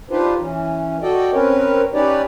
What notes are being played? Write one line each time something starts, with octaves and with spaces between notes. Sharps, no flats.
D4 D#4 F4 G4 B4 C5
E3 C#4
F#4 A4 D5 D#5 G5
C4 C#4 A#4 B4 C#5
C#4 D#4 G4 B4 C#5 D5